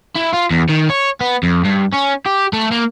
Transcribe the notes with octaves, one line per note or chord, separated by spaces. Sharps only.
E4
F4
E2
D#3
C#5
B3
F2
G2
C#4
G4
A3
A#3